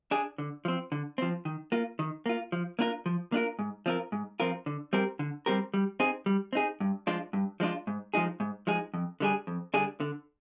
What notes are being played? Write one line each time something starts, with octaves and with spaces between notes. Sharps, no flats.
D4 G#4
D3
F3 C4
D3
F3 C4
D#3
A#3 F4
D#3
A#3 F4
F3
A#3 D4 F4 A#4
F3
A#3 D4 F4 A#4
G#2
F3 C4 F4 A#4
G#2
F3 C4 F4 A#4
D3
G3 C4 G4 A#4
D3
G3 C4 G4 A#4
G3
C4 D#4 G#4
G3
C4 D#4 G#4
G2
F3 G#3 D4 F4
G2
F3 G#3 D4 F4
G#2
F3 G#3 D#4 G#4
G#2
F3 G#3 D#4 G#4
F2
D3 G3 D4 G#4
F2
D3 G3 D4 G#4
D3